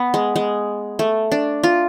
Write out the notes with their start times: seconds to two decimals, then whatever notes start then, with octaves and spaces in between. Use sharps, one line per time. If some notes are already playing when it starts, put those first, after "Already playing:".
Already playing: B3
0.14 G#3
0.36 G#3
0.99 A3
1.32 D4
1.63 F4